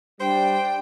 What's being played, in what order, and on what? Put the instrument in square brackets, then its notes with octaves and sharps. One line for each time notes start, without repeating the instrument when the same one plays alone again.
[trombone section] G3 [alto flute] D4 [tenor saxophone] C5 [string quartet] G5